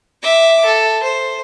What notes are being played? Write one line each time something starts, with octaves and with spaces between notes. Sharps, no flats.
E5 D6
A4
C5